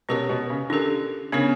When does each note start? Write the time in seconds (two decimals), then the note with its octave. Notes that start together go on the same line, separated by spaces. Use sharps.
0.09 B2 C#4 G4 A#4 C#5
0.29 B2
0.50 C#3
0.70 D3 C#4 G4 A#4
1.32 C#3 B3 D4 A#4 C#5